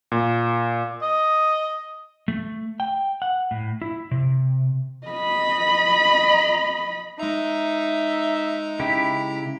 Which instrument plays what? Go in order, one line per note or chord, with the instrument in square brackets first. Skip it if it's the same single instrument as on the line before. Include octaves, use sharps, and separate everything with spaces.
[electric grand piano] A#2
[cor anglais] D#5
[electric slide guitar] A3
G5
F#5
A2
E4
C3
[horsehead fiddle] D#5 B5
[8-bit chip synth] G#3 A#5 [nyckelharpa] D#4 [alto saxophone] E5
[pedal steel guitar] C#3 E4 G4